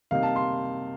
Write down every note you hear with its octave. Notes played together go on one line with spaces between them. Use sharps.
C3 G3 A#3 D#4 F5
A5
C6